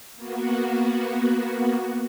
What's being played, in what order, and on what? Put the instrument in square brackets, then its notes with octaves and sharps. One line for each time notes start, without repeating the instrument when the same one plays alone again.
[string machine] A#3 B3 F#4